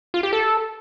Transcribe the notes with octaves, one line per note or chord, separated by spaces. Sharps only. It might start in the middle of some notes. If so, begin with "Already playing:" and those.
F4
G4
A4